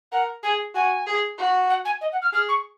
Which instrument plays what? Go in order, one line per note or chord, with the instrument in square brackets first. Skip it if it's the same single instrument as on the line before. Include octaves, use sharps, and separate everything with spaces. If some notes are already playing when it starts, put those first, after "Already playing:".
[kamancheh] A#4 [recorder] F#5
[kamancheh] G#4 [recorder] G#5
[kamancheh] F#4 [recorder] G#5
[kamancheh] G#4
F#4
[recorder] F#5
G#5
D#5
F#5
F6
[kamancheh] G#4 [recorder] F6
[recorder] C#6